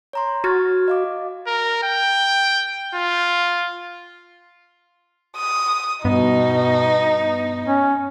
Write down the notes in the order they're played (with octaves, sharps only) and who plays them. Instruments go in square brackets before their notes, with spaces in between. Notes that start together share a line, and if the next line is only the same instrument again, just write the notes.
[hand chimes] C#5 A#5 C6
[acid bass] F#4 [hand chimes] F6 G#6 A6
[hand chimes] D#5 F5 D6
[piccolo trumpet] A#4
G5
F4
[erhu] D#6
[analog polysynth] G2 B3 [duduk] B2 [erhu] D#4
[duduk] C#4